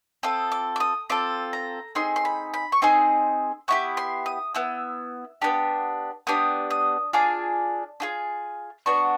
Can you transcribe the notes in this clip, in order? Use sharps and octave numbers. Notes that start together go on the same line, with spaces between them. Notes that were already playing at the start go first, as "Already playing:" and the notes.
C4 F4 A4 D#6
D6
D6
D#6
C4 F4 A4 D6
A#5
C4 D#4 G#4 C6
C6
B5
B5
C#6
C4 D#4 G#4 C6
B3 E4 G4 C#6
C6
D#6
B3 E4 E6
B3 D4 G4
B3 D4 G4 D#6
D#6
D4 F4 G#4 D6
D4 F4 G#4
B3 D4 F#4 C#6